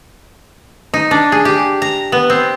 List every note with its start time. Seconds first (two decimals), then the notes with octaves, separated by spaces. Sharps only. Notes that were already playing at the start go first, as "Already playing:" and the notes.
0.94 D#4
1.11 D4
1.32 G#4
1.45 G4
1.82 A#5
2.12 B3
2.30 C4